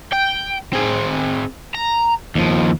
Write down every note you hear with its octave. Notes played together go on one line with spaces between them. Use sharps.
G5
C4 G#4
A#5
D#2 F3